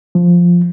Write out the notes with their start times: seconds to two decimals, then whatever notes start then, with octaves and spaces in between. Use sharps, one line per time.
0.15 F3